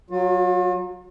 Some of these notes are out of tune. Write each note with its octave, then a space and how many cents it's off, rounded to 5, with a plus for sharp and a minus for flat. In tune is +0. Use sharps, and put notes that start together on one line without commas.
F#3 +0 F4 +45